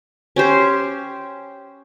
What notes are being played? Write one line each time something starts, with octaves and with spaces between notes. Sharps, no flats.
C#4 G4 C5